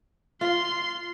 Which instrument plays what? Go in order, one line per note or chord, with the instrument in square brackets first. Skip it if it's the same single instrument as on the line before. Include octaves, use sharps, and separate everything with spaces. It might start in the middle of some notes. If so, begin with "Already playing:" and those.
[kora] F4 [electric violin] C6